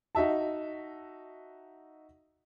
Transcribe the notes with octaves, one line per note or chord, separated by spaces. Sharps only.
D#4 F#4 E5 A5